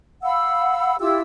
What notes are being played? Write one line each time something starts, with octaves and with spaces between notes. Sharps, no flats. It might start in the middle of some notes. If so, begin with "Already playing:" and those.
F5 F#5 B5 E6
E4 F4 G4 E6